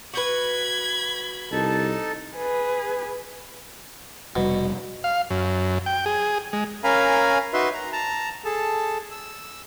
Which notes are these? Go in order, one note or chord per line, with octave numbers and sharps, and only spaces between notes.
F#4 B4 B5 G#6
C2 D#4 A4 A5
G#4 B4
F1 B2 G3
F5
F#2
G5
G#4
G#3
C#4 A#4 F5 G#5 A#5 B5
D#4 F#4 B4 E5 C6
A#5
A5 A#5
G#4 A4 A5
E6